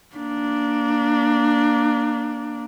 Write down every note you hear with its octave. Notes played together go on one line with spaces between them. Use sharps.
A#3 D4